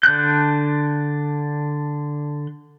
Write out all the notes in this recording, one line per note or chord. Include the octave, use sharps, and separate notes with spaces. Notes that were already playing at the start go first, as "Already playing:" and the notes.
D3 D4 F#6 G6